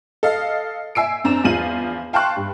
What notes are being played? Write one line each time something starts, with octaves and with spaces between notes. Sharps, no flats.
A4 D#5 F5
E5 G#5 E6 C7 D7
F#2 C4 D4 A#5 E7
E2 F3 F5 D#7 F#7
F5 G5 A5 C6 C#6 F#6
G2